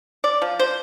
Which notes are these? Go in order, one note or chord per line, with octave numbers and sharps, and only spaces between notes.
D5
F3
C5